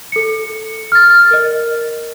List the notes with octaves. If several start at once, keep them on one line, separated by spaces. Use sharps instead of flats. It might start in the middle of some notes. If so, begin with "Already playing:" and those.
A4 C#7
F6 A6
A#4 D#5